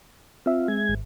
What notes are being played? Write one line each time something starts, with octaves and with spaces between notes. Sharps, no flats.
C4 F4 E5
G#3 G#6
G#1